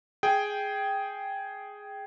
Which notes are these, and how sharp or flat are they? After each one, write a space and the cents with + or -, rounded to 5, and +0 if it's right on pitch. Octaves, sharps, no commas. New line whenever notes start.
G#4 +0 G5 +0